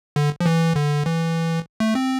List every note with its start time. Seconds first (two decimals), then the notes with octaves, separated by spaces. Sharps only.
0.16 D3
0.40 F3
0.46 E3
0.76 D3
1.06 E3
1.80 A3
1.95 C4